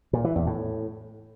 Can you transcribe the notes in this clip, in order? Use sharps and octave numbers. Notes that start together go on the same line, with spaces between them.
A#2
E3
E2
A2